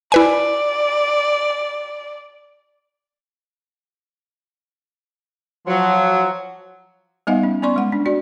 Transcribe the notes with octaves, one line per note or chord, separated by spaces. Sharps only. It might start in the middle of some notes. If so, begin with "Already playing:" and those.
E4 B4 D5 G#5
F3 F#3
G3 B3 D#4 D#5 F5 F#5
C#4
B3 C#4 D5 C6 C#6
G#3 F#5
D4
D4 F#4 D5